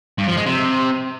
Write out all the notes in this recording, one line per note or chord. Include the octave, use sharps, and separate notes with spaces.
G2
F3
G#3
C3